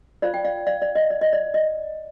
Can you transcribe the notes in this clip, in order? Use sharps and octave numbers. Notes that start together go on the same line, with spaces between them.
F4 C5 D5 F5
G5
D5 F5
D5 F5
D5
D#5
D5
D#5
D5
D#5